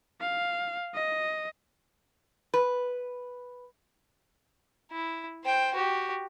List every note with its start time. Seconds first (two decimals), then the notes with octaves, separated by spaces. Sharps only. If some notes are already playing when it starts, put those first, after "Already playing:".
0.21 F5
0.95 D#5
2.54 B4
4.92 E4
5.44 C5 G5
5.74 F#4 G4